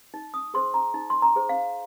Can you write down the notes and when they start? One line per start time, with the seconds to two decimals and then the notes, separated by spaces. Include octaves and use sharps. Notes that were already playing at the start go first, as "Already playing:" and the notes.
0.14 D#4
0.34 D#6
0.54 G#4 C5 C6
0.74 A#5
0.94 D#4
1.10 C6
1.22 A#5
1.36 G#4 C5
1.49 F5